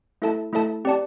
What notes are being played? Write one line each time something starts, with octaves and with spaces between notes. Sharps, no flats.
A3 E4 A4 E5 A5
A3 E4 A4 E5 A5
C4 G4 D5 A5